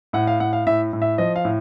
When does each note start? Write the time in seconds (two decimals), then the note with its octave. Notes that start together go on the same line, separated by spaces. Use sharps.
0.13 A2 F#5
0.27 F5
0.40 A2 F#5
0.53 F5
0.67 A2 E5
0.93 A2
1.02 E5
1.18 F3 D#5
1.36 F5
1.45 A2